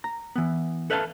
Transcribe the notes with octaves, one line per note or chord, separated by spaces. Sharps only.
A#5
E3 B3
A4 B4 E5 F5 G#5 A5